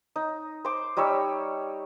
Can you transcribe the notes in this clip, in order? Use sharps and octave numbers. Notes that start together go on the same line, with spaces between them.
D#4
C5 D6
G3 D#4 C#5 E6